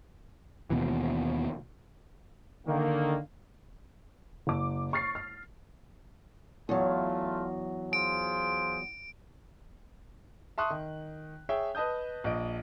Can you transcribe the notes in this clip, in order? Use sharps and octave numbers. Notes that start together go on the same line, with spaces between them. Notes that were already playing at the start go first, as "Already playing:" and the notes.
D#2 B2 E3
D3 D#3 A#3
F#1 D6
C#6 F6 A6 C7
F6
E2 F#3 A3 F4
F4 G#4 C5 D7
E5 A5 C6 C#6 D#6 F#6
D#3
G#4 C#5 E5 G5
B4 D#5 A5 D#6 G6
A#1 D#5 D7